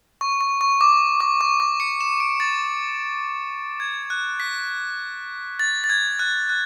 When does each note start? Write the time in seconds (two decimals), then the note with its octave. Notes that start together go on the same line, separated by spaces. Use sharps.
0.21 C#6
0.41 C#6
0.61 C#6
0.81 D6
1.20 D6
1.41 C#6
1.60 D6
1.80 C#7
2.01 E7
2.20 D7
2.40 A6
3.80 G#6
4.10 F#6
4.40 B6
5.59 A6
5.84 A6
5.90 G#6
6.19 F#6
6.49 F#6